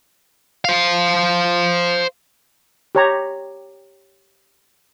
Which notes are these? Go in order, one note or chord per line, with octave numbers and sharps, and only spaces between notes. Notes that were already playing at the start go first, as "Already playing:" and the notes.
C5 F5
G4 C#5 A#5